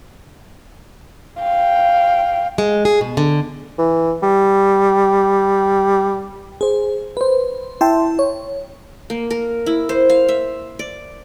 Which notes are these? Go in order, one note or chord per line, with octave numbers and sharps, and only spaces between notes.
F5 G5
G#3
G#4
B2
D3
E3
G3
G#4 C5
B4 C5
E4 E5 G5 A5 C6
C#5
A#3
A#4
E4
C5
F5
E5
D5